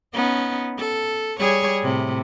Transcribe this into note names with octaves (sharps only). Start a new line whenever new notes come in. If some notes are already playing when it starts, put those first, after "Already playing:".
B3 C#4 D#4
A4
G3 G#4 C#5
A2 C3